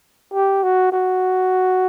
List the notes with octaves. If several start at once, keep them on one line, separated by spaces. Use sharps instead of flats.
G4
F#4
F#4